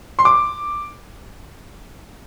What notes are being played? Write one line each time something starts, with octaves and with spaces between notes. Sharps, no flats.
C6
D6